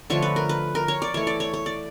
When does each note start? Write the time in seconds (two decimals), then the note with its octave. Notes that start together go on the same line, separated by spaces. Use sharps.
0.10 D3 F3 A3 C#5
0.22 B4
0.36 A#4
0.49 B4
0.75 A#4
0.88 C#5
1.02 D5
1.14 E3 A3 C#5
1.27 D5
1.40 C#5
1.53 C#5
1.66 D5